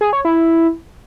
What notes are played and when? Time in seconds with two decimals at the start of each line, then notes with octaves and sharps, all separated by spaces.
0.01 G#4
0.13 C#5
0.25 E4